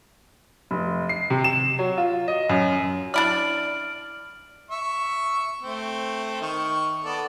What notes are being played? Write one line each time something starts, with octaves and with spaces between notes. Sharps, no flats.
F1
C7
C3
E7
F#3
F4
D#5
F#2
D4 E4 D5 F6 D7 F#7
E5 C#6
A3 C4
D#3 C#6
B3 A4 D5